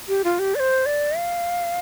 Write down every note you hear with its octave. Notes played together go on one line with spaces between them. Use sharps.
G4
F4
G4
D5
C5
D5
F5